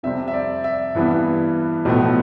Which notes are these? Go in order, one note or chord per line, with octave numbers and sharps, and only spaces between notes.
F2 C3 G3 C4 E5
E5
D5
E5
G2 E3 B3
B1 A2 F3 B3